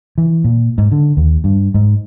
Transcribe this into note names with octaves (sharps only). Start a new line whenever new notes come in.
E3
A#2
G#2
D3
D#2
G2
G#2